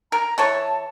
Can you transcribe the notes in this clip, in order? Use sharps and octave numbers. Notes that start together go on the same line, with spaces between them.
A#4 A#5
E3 A4 C#5 A5